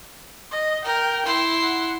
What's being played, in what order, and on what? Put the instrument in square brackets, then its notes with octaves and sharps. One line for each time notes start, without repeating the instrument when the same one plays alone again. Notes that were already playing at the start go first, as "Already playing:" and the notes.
[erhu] D#5
[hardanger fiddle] A#4 [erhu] G5
[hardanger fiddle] E4 C6
[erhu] F#5